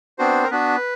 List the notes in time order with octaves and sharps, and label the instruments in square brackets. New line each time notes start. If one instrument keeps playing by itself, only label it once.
[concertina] B3 C4 D4 F#4 C5
A#4
B3 D4 F#4 B4